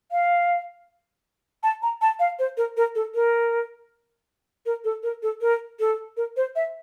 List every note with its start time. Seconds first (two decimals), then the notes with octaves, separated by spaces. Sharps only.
0.12 F5
1.63 A5
1.82 A#5
2.02 A5
2.20 F5
2.39 C5
2.57 A#4
2.77 A#4
2.95 A4
3.15 A#4
4.66 A#4
4.84 A4
5.03 A#4
5.23 A4
5.41 A#4
5.80 A4
6.17 A#4
6.37 C5
6.56 E5